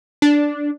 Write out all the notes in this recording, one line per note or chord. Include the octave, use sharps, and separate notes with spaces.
D4